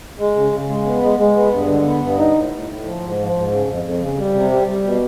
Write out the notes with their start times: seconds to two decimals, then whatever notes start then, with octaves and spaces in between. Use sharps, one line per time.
0.19 G#3
0.36 C#3
0.52 C#3
0.69 G#3
0.85 B3
1.02 G#3
1.18 G#3
1.36 B3
1.52 G2
1.68 D3
1.85 B3
2.02 G2
2.18 D#4
2.35 A2
2.52 A2
2.69 A2
2.84 F3
3.01 G#2
3.18 F3
3.35 G#2
3.51 C#3
3.68 F2
3.84 F2
4.00 C#3
4.18 G3
4.34 C3
4.51 G3
4.68 G3
4.84 B2